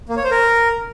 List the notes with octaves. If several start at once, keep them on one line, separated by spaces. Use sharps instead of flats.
A#3
C#5
C5
A#4